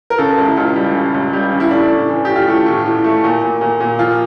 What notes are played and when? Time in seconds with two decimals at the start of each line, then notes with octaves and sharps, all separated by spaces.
0.10 A#4
0.18 C#3 A4
0.38 C#2
0.47 E4
0.56 C#2 F4
0.76 G3
0.95 C#3
1.14 C#2
1.33 G3
1.52 C#3
1.60 E4
1.71 A2 D4
1.90 A2
2.09 E3
2.25 A2 G4
2.36 F4
2.47 A3 E4
2.66 A2
2.86 A2
3.04 A3
3.24 A#2
3.43 A#2
3.61 A#2
3.80 A#2
3.99 F3 F4